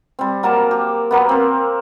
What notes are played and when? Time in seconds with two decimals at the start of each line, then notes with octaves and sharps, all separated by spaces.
0.19 G3 C4
0.43 F#3 A#3 A#4 A5
0.71 G4
1.11 F#3 A#3 B3
1.29 C4 A#4